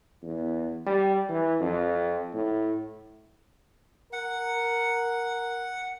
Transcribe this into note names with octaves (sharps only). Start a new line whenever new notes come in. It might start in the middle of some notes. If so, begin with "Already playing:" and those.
E2
G3
E3
F2
A2
A#4 F#5